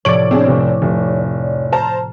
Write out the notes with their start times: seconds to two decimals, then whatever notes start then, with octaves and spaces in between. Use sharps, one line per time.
0.05 A2 C3 F3 C#5 D5 D7 F#7
0.31 C4 D4 G#4
0.46 F1 C4
0.82 F1
1.72 C5 A5 A#5 F6